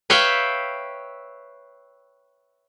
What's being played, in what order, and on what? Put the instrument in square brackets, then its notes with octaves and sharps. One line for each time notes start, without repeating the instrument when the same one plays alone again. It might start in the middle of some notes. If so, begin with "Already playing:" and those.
[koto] B4 C#5 E5 F5 G5